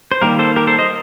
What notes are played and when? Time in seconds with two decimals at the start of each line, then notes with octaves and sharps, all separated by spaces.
0.12 C5
0.22 D#3 G3 A#3 G4 A#4
0.39 A4 C5
0.56 G4 A#4
0.67 A4 C5
0.79 C5 D#5